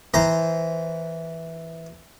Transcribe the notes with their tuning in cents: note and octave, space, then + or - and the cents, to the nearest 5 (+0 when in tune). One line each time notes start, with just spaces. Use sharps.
E3 -5 C5 -15 A#5 +0